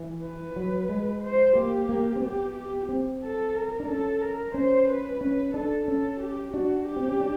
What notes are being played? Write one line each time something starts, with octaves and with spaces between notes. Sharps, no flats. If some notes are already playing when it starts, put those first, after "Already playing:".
Already playing: E3
B4
F#3
G#3
C5
A#3 G4
A#3
C4
B3 G4
G4
C4
A4
A#4
D4
C#4 A4
A#4
C#4 C5
B4
C#4 B4
D4 A4
C#4 A4
G4
D4 F#4
G4
C4
C#4
D4